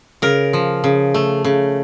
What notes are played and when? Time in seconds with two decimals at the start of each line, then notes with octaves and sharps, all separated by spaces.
0.22 C#3 A#4
0.53 F3
0.84 C#3
1.14 A3
1.44 C#3